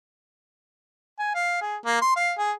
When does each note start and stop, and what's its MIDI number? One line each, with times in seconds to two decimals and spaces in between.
1.19 1.32 80
1.35 1.57 77
1.61 1.76 68
1.86 1.99 58
2.02 2.14 84
2.16 2.33 77
2.38 2.52 68